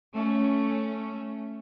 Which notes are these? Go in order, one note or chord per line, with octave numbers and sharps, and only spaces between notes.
A3 C#4